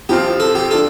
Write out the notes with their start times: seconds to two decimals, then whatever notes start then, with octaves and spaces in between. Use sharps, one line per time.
0.09 F2 F3 C4 F4 G4
0.40 A4
0.55 G4
0.71 F3 D4 F4 A4